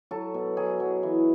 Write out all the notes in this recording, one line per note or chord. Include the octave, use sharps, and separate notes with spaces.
F#3 A4
B2
F#3 G#4
F#3
E3